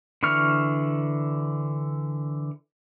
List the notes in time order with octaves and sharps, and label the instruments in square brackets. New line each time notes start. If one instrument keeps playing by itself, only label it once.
[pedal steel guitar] D3 E3 C#6 F6